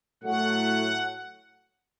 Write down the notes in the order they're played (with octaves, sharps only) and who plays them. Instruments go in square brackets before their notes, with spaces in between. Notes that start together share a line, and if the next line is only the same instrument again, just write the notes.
[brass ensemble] A2 F#3 A3 [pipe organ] F#5